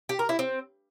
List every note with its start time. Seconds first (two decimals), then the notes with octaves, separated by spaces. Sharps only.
0.09 G4
0.19 A#4
0.29 E4
0.39 C4